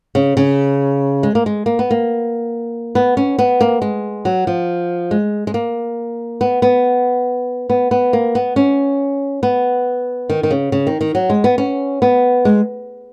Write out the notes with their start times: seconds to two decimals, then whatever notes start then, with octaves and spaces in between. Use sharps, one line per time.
0.15 C#3
0.37 C#3
1.23 G#3
1.35 A#3
1.46 G#3
1.66 A#3
1.79 B3
1.91 A#3
2.95 B3
3.17 C#4
3.39 B3
3.61 A#3
3.82 G#3
4.25 F#3
4.47 F3
5.11 G#3
5.47 G#3
5.54 A#3
6.41 B3
6.62 B3
7.70 B3
7.91 B3
8.13 A#3
8.35 B3
8.56 C#4
9.43 B3
10.30 D#3
10.43 D#3
10.51 C#3
10.72 C#3
10.87 D#3
11.01 D#3
11.15 F#3
11.30 G#3
11.44 B3
11.58 C#4
12.02 B3
12.45 G#3